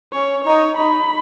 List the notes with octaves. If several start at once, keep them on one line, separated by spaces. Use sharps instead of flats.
C#4 C#5
D#4 C#5
D#4 B5